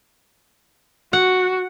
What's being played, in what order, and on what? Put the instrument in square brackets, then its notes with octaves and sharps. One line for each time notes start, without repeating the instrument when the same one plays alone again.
[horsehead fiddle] F#4 [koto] F#5